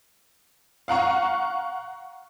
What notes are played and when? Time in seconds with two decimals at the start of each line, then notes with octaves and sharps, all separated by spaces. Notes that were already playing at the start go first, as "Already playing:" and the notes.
0.88 F5 F#5 A#5 C#6